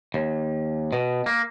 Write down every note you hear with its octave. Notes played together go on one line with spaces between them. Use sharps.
D#2
B2
A#3